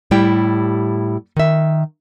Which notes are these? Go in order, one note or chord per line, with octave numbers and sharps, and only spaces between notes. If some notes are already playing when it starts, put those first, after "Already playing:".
A2 G3 E4 G4 G5
D#3 E5